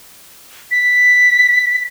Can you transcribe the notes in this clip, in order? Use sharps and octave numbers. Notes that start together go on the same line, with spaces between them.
B6